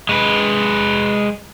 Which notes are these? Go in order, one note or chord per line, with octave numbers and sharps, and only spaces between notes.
G#3 B4